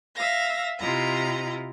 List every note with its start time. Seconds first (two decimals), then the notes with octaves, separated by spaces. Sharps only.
0.16 E5 F5 A#6
0.79 C3 E4 F4 D#5 A#5